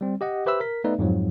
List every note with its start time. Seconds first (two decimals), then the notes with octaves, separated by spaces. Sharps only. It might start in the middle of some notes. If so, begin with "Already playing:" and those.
0.01 G3 C4
0.21 G4 D#5 F#5
0.46 G4 B4 C5 E5 B5 E6
0.60 A#4 B6
0.84 A3 B3 D#4 B4 D5 E5
0.98 F2 G#2 F3 F#3